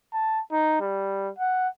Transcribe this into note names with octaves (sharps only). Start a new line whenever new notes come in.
A5
D#4
G3
F#5